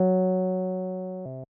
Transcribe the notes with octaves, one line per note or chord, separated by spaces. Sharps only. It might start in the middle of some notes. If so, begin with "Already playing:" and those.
Already playing: F#3
C3